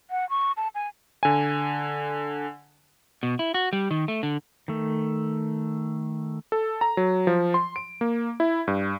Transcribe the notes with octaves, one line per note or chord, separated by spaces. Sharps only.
F#5
C#6
A5
G#5
D3 G#5
B2
E4
F#4
G3
D#3
A3
D3
D#3 A3
A4
A#5
F#3
F3
C6
D7
A#3
E4
G2